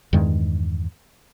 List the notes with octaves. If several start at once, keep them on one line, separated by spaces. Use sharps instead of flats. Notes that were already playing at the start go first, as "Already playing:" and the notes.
E2 G2 D#3 G#3